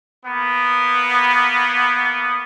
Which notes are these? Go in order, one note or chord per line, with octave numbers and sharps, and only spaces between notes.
A#3 B3